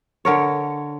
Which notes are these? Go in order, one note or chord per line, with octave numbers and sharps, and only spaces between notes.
D3 A#4 C#5